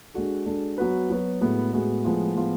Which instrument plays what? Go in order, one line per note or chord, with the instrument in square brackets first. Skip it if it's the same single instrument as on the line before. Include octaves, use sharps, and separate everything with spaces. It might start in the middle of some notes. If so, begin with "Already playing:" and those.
[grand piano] G#3 D4 F#4 A4
G#3 D4 F#4 A4
F#3 B3 F#4 B4
F#3 B3 F#4 B4
A2 G#3 B3 F#4
A2 G#3 B3 F#4
A2 F3 G#3 B3 F4
A2 F3 G#3 B3 F4